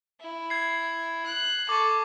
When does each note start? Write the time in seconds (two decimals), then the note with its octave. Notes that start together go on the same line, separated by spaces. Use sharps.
0.20 E4
0.50 G#6 C7
1.26 F#6
1.69 A4 C#6 D6